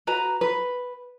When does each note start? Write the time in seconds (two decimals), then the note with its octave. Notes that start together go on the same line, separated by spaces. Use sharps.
0.07 F#4 B4 A#5
0.41 B4